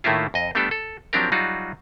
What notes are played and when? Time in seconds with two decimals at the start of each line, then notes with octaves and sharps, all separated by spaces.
0.04 A2 D#3 A3 A#3 E4 F4
0.34 F2 D#5
0.55 G3 A3 B3 D4 G4 A4
0.71 A4
1.13 F3 F#3 C4 D4 G4 A#4
1.32 F#3 G3 D#4 F4 F#4